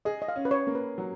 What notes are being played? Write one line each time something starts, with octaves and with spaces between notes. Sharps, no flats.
G#4 D#5
D#5
F5
C#4
B4
C#5
A#3
B4
F#3